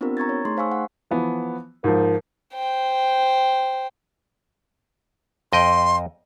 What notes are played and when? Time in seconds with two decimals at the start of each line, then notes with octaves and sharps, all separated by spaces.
0.01 B3 C4 D4 F4 G4 A#4
0.17 A#5 C#6 G#6 A6
0.29 C#5
0.45 A3 D#4 G#4 C6
0.57 C5 F5 G#5 C#6 E6
0.72 F#5
1.11 E3 F3 B3
1.84 G#2 F3 A#4
2.54 C5 G5
5.53 F2 D#5 G5 C6